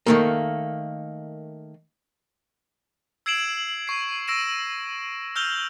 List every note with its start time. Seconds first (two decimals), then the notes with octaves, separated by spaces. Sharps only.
0.06 D#3 A3 A#3
3.26 E6 G#6 C7 D7 E7 F#7
3.87 C#6 C7
4.28 C#6 E6 A#6 D7 E7
5.36 E6 F6 G6 F7 G7